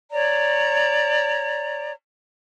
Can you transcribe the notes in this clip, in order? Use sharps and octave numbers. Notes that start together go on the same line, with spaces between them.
C#5 D5 A#5